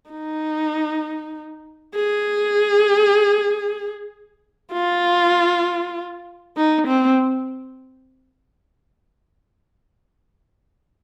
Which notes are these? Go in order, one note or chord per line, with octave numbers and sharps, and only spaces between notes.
D#4
G#4
F4
D#4
C4